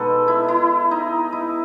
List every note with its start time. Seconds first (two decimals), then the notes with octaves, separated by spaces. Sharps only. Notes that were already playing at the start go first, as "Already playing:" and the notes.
Already playing: B2 G#3 D#4 A4 B4
0.28 E4
0.48 E4
0.91 D#4
1.32 E4